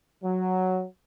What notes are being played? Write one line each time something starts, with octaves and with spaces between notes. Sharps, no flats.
F#3